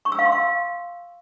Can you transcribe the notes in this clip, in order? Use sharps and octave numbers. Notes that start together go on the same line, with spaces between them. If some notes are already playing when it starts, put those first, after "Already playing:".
C#6
E6
F5
C6
F5